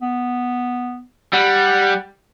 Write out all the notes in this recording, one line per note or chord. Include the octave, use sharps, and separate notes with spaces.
B3
G3 F#5